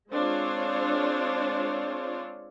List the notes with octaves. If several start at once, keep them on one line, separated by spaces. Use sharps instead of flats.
G#3 C4 D4 F4 C5 C#5